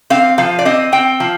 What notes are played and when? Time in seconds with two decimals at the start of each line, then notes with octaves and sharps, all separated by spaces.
0.10 C4 F5
0.38 F3 F5
0.59 D5
0.65 C4 D#5
0.92 C4 G5
1.20 F3